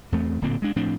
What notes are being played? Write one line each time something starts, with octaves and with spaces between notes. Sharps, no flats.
E2 A3 C4
D1 A#2 D3 C4
G#3 D4
A2 F3 C4 D4